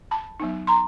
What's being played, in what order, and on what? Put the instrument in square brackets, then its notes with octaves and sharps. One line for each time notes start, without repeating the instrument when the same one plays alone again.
[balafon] A5 B5
F#3 B3 D#4
A#5 C6